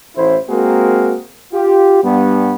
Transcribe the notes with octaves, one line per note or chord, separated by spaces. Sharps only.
A1 E4 C5
G#3 A#3 C4 F#4 G#4 A#4
F4 G4
G2 B3